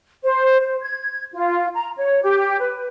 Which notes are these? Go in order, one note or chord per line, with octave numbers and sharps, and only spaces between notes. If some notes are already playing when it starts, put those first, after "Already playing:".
C5
C5
G#6
F4
A#5
C#5
G4
B4